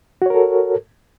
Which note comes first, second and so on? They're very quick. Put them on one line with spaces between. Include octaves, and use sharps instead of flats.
F#4 C#5 A#4 A4